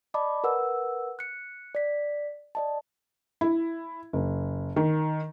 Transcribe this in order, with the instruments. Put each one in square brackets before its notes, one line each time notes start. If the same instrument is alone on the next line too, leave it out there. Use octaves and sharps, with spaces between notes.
[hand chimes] D5 D#5 A5 B5 D6
A#4 B4 F#5 E6
F#6 C#7
D5 B6
D5 D#5 A5
[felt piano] E4
F#1
D#3